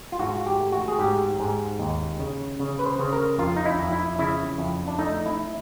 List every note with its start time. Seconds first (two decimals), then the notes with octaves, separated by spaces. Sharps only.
0.12 F4
0.19 G#2 F#4
0.46 G4
0.60 A3
0.72 F#4
0.88 G#4
0.99 G#2 G4
1.40 G#2
1.79 D#2
2.20 C#3
2.59 C#3
2.79 B4
2.86 C5
2.99 C#3
3.13 A#4
3.38 F2 F4
3.57 D#4
3.66 E4
3.79 F2
3.92 E4
4.19 C#3 E4
4.58 F2
4.88 D4
4.99 A3 D#4
5.26 E4